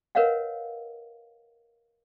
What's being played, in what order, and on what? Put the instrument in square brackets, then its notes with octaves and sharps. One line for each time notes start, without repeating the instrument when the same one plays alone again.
[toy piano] A#4 B4 C#5 D#5 F5 F#5